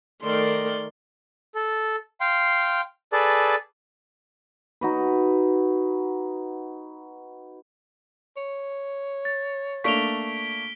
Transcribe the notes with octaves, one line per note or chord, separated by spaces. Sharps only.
D#3 A3 A#4 D5 C6
A4
F5 G5 C6
G#4 A4 B4 D5 A5
D#4 F#4 B4
C#5
A6
A3 A#3 D4 C#6 B6 D7 F7 G7